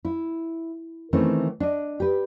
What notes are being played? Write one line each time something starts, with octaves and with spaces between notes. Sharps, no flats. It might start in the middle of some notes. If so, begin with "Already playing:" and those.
E4
D#3 E3 A3 C4 C#4 E4
D4 D#5
G4 B4